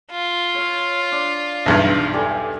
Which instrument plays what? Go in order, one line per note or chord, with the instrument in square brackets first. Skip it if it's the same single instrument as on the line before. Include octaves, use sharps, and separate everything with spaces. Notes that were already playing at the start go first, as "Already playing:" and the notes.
[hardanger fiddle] F4
[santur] C#5 F5
D4
[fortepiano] B1 E2 G2
[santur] G3 A4 G#5